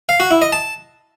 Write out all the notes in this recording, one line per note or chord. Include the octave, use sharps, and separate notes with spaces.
F5
F#4
E4
D#5
A5